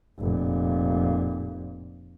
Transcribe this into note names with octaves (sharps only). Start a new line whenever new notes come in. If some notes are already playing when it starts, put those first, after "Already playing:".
F1 A#2